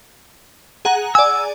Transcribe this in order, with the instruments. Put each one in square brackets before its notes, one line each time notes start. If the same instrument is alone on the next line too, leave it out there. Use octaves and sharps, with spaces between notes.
[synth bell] G#4 F#5 A#5
[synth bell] D5 G#5 [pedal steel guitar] E6